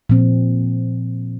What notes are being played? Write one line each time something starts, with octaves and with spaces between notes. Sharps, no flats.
A#2 F3 C4